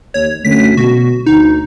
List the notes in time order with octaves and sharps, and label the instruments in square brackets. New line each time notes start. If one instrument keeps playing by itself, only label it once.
[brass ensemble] D#2 [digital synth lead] C#5
[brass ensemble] F#2 D3 A3 [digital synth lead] B6
[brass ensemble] B2 [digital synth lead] F#4
[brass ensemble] D2 [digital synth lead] D#4